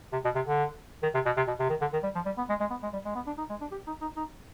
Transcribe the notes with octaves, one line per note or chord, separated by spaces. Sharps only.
C3
B2
C3
D3
D#3
C3
B2
C3
B2
C3
D#3
D3
D#3
G3
F3
G3
B3
G#3
G#3
B3
G#3
G3
G#3
B3
D4
D#4
G#3
D4
G4
D#4
D#4
D#4